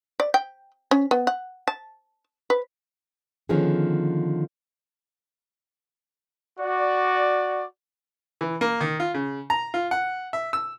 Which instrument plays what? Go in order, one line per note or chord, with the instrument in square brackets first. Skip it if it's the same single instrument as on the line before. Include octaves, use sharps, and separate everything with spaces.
[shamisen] D5
G5
C#4
B3
F#5
A5
B4
[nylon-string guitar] D3 D#3 F3 B3 C#4 G#4
[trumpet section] F#4 D5
[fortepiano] E3
A#3
D#3
F4
C#3
A#5
F4
F#5
E5
E6